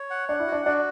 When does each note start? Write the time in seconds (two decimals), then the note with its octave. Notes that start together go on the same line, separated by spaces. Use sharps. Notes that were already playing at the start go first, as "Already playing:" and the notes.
Already playing: C#5
0.10 F#5
0.29 D4 F#5
0.40 E4
0.47 F#4
0.52 D4
0.66 D4 F#4